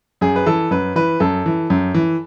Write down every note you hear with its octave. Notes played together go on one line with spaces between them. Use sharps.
F#2 G#4
B4
E3 A4
F#2 B4
E3 B4
F#2 A4
E3
F#2
E3